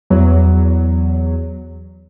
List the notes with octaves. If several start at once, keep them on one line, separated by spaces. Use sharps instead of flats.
E2 F#3